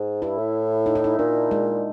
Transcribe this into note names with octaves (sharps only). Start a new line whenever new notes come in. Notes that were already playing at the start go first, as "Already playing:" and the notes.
Already playing: G#2
G2 E4
A2
D#4
E4
D#4
A#2 D4
G#3